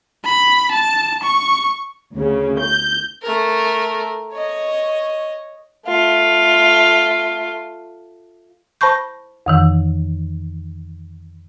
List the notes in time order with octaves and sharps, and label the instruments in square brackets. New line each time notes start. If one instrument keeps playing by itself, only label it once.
[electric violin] B5
A5
C#6
[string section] D2 C#3
G6
[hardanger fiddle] A3 A#4
C#5 D#5
A3 F4
[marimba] C5 A5 B5 C#6 G6
F2 D#3 E3